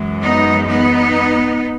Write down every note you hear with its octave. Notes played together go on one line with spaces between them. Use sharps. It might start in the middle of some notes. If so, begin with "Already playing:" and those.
Already playing: F#2 E3 G#3
B3 D#4
B3 D#4